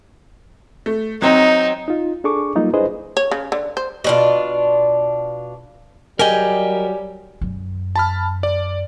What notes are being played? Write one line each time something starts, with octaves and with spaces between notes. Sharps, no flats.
A3
F#3 C4 D#4
D#4 F4
D4 G#4 A4 C#6 D6
F#3 G3 A#3 D#4 F4
D4 E4 G#4 B4 C5 D#5
C#5
C#3
D3
C5
B2 D4 F4
F#3 G3 G4 G#4 A#4 D#5 G5
F#2
A5 B5 F6
D5